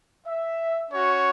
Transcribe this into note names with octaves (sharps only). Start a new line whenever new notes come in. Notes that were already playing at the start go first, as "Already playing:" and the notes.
E5
C#4 F#4 C#5